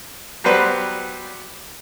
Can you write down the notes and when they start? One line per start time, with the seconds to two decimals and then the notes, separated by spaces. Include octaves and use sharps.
0.44 F#3 G3 B3 B4 C5